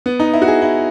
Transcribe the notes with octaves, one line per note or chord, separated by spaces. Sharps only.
B3
D#4
E4
F#4
G#4
E4